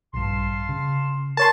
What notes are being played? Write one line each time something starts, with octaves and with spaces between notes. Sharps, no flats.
A#1 G2 F5 A5 C6
C#3
A#4 C#5 A5 C6